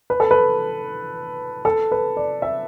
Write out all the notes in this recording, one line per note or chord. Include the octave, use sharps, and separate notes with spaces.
B4
A4
B4
A4
B4
D5
E5